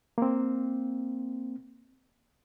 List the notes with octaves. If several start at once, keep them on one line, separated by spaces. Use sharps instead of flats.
A#3 C4